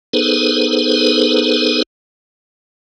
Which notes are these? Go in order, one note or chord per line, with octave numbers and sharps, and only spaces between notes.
B3 D#4 G#4 A4 B4 C5